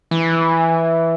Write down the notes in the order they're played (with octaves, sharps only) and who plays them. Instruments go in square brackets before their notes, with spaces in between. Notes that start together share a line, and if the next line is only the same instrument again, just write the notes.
[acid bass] E3